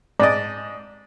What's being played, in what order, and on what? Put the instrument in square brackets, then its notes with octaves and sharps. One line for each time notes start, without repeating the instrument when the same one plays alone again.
[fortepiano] G#2 D#5 [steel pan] D5